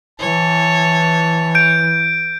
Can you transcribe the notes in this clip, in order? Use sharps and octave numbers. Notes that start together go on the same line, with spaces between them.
E3 C#5 A5
G6 D7